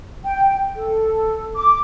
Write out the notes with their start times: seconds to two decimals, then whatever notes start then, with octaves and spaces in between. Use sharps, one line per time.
0.24 G5
0.76 A4
1.56 D6